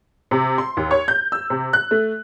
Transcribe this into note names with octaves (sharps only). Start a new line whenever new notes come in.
C3
C6
D#2
C#5
G6
E6
C3
F#6
A3